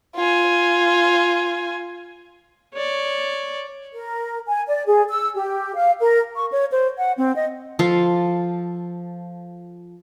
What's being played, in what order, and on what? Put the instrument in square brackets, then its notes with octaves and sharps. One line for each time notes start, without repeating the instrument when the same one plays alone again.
[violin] F4 G#5
[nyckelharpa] C#5 D5
[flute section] A#4
G#5
D5
G#4
E6
G4
F5
A#4
[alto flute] C#6
C#5
C5
F#5
C4
D#5
[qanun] F3 A4 F5